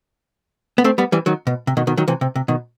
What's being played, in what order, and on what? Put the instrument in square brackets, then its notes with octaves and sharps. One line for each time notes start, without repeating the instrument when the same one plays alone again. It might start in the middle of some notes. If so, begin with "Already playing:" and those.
[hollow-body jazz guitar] B3
A3 C4
G3 B3
E3 G3
D#3 F#3
B2
C3
B2 D#3
B2 D#3
D#3 F#3
C3 E3
C3
C3
B2 D#3